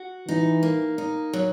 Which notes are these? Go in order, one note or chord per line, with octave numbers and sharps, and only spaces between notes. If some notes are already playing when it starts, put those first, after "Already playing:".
Already playing: F#4
E3 D#4
A#3
D#4
F#3